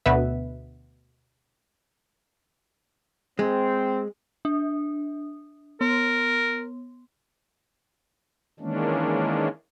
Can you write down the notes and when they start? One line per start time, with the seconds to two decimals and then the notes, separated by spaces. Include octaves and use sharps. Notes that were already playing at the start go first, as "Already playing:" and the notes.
0.06 D2 B2 B3 B4 E5
3.39 G#3 C4
4.45 D4
5.81 B3 A#4
8.60 D#3 E3 G#3 A#3 C#4 D4